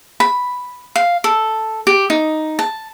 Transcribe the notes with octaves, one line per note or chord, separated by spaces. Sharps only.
B5
F5
A4
G4
D#4
A5